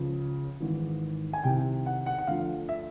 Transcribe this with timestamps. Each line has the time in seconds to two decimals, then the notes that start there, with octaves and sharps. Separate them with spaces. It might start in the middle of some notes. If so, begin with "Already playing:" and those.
Already playing: C#2 C#3 F3
0.60 G#1 G#2 E3
1.33 G#5
1.44 C2 C3 D#3 G5
1.86 F#5
2.06 F#5
2.18 F#5
2.27 D2 D3 F3 F5
2.69 E5